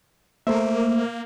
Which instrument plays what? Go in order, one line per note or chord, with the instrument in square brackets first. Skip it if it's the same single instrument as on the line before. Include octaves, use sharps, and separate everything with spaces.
[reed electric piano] A3 C5 E5 [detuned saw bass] A#3